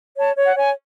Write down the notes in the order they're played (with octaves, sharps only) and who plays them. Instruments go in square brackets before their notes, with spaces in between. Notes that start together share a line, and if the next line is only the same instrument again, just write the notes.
[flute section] C#5 A5
C#5
F#5
C#5 G#5